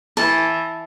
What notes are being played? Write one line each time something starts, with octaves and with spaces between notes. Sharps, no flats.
E3 A5